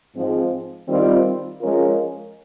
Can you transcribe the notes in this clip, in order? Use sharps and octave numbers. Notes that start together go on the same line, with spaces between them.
G#2 F3 G#3 C4
D#3 G3 C4 F4
F3 G#3 C#4 F4 A#4